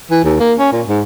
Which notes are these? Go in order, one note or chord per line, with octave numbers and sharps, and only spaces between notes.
E3
D#2
A#3
C#4
A#2
G#2